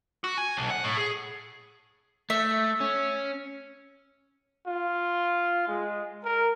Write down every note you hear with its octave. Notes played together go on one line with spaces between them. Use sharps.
F#4
G#5
B1
F#5
A2
G#4
A3 E5
C#4
F4
G#3
A#4